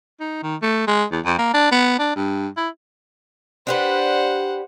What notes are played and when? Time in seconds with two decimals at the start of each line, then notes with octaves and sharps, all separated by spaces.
0.20 D#4
0.43 D#3
0.62 A3
0.87 G#3
1.11 E2
1.25 F2
1.38 A#3
1.54 D4
1.71 B3
1.99 D4
2.16 G2
2.57 E4
3.67 D4 G4 B4 C5 F#5